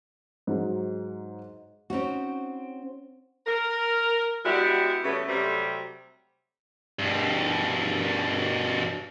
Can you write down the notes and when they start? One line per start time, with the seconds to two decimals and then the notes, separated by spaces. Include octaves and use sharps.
0.47 G#2 F#3 D#4
1.90 C4 C#4 D#4 F#4
3.46 A#4
4.44 G3 G#3 B3 E4 F#4 G4
5.04 C#3 G3 A3 B3 C#4
5.27 C3 F#3 G3 A3 C4
6.99 G2 B2